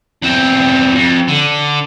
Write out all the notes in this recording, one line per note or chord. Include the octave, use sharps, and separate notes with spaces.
E2 C4
F2
D3